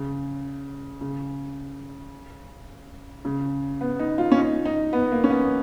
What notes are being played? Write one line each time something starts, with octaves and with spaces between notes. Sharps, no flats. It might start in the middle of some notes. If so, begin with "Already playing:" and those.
Already playing: C#3
C#3
C#3
B3
D#4
F4
C#4
D#4
D#4
B3
A#3
C#4
B3